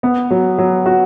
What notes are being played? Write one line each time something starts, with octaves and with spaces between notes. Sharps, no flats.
B3
F#3
F#3
F#4